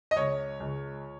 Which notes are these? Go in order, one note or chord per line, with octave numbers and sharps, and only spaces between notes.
D#5
C#2 C#5
C#2